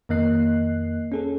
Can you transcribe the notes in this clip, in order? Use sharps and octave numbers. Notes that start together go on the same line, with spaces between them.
F2 D#3 A#3 D#5 F#6 C7
C#4 G#4 A4